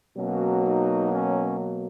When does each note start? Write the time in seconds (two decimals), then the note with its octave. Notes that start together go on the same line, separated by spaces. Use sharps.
0.15 B2 F#3 A#3 C#4
0.63 D#4
1.11 C#4
1.59 B3